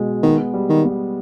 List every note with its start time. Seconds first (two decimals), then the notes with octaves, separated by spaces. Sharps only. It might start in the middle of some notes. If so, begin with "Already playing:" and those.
Already playing: B2 G#3
0.23 D#3 B3
0.54 G3
0.69 D#3
0.84 B3